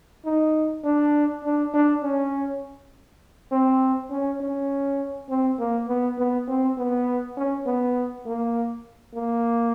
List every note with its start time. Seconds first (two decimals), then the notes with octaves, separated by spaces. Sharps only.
0.25 D#4
0.84 D4
1.44 D4
1.74 D4
2.03 C#4
3.52 C4
4.10 C#4
4.40 C#4
5.30 C4
5.59 A#3
5.88 B3
6.18 B3
6.48 C4
6.77 B3
7.37 C#4
7.66 B3
8.26 A#3
9.14 A#3